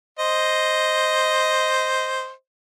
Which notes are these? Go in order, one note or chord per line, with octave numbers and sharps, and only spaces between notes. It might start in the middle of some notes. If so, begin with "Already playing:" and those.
C5 D#5